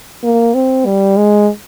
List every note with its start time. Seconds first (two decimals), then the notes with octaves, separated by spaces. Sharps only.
0.23 A#3
0.54 C4
0.86 G3
1.17 G#3